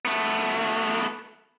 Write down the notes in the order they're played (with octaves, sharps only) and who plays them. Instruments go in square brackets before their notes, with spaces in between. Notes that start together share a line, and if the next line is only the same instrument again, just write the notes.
[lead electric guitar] A3 B3